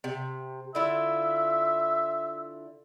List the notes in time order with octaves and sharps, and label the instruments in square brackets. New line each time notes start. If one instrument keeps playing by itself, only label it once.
[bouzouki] C3
[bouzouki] D3 E4 F4 [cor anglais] E5